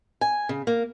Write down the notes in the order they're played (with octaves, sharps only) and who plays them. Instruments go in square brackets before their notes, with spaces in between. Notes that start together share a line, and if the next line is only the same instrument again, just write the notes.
[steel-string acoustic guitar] G#5
C#3
A#3